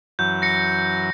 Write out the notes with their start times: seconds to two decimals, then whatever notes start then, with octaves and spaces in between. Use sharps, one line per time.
0.19 F#2 E3 F#3 G6
0.42 A#6 C#7